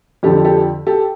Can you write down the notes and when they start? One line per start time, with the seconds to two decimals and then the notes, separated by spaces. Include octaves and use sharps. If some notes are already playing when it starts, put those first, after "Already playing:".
0.23 F2 D3 F3 G4 A4
0.45 G4 A4
0.87 G4 A4